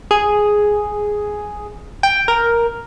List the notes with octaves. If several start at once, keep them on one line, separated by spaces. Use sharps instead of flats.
G#4
G5
A#4